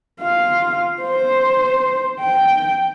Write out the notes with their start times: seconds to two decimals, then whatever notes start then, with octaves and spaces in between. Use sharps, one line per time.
0.21 F4 F5
1.02 C5
2.20 G5